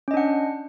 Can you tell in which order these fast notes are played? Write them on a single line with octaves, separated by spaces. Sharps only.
C#4 D#5 D4 F#5